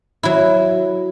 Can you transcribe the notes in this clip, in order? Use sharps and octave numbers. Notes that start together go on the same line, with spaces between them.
F#3 E4